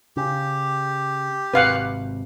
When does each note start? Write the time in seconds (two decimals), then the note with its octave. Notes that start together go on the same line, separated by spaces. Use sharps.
0.17 C#3 G4
1.54 G#1 C3 B4 F5 F#5